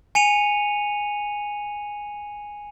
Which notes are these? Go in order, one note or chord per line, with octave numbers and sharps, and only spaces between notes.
G#5 C#7 D#7 F7